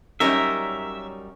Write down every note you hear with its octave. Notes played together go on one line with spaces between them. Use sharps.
F#2 G3 C#4 D#4 A#4 E5